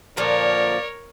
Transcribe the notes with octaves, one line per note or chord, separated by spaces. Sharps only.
A#2 D3 F3 A#4 C#5 D5